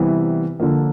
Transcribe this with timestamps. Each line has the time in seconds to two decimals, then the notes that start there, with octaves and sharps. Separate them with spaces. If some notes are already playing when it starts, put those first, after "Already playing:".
Already playing: C3 E3 G3 B3 E4
0.60 D3 F3 A#3